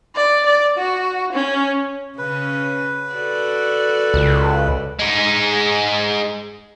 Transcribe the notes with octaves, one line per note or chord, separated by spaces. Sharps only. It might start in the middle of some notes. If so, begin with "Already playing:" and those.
D5
D5
F#4
C#4
C#3 C#4 B4
F#4 A4 D5
C#2
G#3 D#4